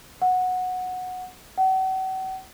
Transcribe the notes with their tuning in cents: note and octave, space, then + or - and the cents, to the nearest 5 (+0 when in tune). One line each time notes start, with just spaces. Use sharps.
F#5 -10
F#5 +40